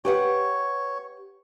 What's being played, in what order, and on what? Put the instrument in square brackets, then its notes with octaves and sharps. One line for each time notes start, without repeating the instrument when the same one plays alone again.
[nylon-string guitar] G4 B4 F#5 [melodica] C#5